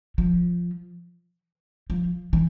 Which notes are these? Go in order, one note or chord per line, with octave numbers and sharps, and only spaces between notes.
F3
F3
E3